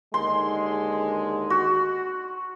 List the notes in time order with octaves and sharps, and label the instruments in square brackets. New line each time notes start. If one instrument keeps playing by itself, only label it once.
[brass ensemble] D#2 D3 G#3 [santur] C6
[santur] F#4